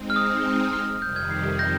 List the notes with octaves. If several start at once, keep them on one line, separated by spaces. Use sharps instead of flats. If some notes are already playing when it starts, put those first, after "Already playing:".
Already playing: G#3 C4 D#4
F6
D#6
F6
F2 C3 D#3 G3 G6
F6 G#6
G#6 C7
G6 A#6